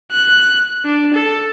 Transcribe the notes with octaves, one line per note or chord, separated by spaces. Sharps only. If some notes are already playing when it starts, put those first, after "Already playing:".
F#6
D4
A4